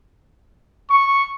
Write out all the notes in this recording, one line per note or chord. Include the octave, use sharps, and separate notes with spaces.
C#6